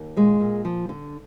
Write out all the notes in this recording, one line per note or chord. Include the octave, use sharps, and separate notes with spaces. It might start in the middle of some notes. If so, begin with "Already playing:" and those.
Already playing: D#2
A#2 G#3
A#2
F3
D3